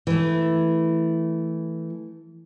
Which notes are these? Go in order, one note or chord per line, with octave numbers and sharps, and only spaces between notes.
E3 A3